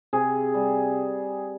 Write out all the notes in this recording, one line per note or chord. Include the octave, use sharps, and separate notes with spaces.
C3 G#4
G3